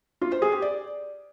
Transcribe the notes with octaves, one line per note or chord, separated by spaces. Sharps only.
F4
C5
G#4
G4
D5